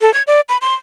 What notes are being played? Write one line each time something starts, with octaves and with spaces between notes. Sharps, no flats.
A4
G#6
D5
B5
C6